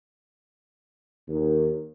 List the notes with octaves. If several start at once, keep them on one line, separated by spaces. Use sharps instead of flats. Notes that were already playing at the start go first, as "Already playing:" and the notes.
D#2